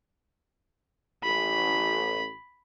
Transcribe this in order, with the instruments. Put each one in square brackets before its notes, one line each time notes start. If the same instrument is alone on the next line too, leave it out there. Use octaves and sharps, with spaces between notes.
[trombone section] A1 [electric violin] B5